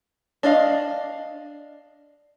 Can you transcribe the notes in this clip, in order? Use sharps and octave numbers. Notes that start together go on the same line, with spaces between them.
D4 D5 D#5 F5